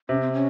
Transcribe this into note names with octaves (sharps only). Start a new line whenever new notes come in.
C3 C#4
C4
C#4